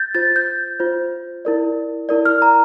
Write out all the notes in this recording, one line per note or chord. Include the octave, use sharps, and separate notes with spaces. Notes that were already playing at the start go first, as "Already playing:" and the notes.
Already playing: G6 A6
F4 C5 A6
G6
F4 C5
E4 A#4 D5
E4 A#4 D5
F6
A#5